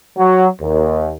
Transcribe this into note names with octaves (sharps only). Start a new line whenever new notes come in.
F#3
D#2